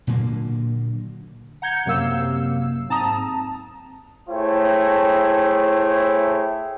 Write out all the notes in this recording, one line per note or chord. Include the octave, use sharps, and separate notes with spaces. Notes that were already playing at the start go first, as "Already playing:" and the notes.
A#2 D3 F#3 A#3
F#5 A#5 G6 G#6 C#7
F#2 C3 F#3 A#3 F5 E6
G#2 C4 A5 A#5 D#6
A3 E4 G#4 C5 C#5 G5